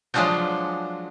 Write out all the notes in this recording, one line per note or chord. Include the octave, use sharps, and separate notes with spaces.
F3 F#3 G#3 D4 F4 F#4